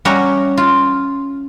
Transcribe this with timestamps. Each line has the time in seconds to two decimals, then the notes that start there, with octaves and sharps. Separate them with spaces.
0.05 G3 C#4 E5 F#5 A#5
0.57 F4